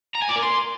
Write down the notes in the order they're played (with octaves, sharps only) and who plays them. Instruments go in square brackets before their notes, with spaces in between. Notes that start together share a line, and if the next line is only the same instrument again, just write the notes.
[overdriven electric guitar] A#5
G#5
D5
A#4
C6